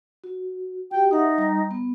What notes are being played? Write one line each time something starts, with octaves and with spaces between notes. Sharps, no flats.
F#4
F#4 G4 G5
D#4 E5 F#5 D#6
G3 A#5
B3